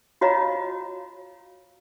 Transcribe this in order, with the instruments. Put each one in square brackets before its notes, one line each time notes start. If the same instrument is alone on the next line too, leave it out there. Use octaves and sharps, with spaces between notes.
[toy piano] F4 F#4 C#5 D#5 F5 A#5